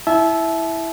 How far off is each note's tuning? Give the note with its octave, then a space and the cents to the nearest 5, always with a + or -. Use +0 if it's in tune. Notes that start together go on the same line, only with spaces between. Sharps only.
E4 +0 E5 +0 A5 -35